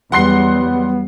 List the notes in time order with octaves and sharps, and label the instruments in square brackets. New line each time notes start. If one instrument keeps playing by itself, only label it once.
[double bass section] E2 F#3 G3 [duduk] B3 [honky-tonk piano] F#5 C6 C7